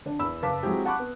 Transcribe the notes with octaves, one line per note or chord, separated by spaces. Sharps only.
D3 D4
E2 B5 E6
F#1 B4 F5 A5 D6 B6
F#3 G#3 C4 E4 G4
F#5 A5 B5 C#6 D6 F#6
B3